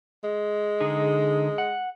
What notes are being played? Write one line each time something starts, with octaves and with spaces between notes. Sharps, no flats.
G#3
D3 D#4 G#4
F#5